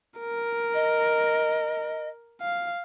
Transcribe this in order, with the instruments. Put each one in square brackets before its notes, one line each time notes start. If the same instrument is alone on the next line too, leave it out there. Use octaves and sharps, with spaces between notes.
[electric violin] A#4
[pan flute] D#5
[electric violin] F5